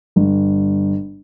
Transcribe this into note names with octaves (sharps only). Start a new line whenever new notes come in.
G1